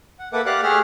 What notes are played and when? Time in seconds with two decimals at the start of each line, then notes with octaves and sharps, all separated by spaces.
0.19 F#5
0.33 A#3 A4 B4 E5 F#5 D6
0.46 G4 D5 F5 F#5 D6 F#6
0.63 A3 G4 G#4 E5 F#5 F6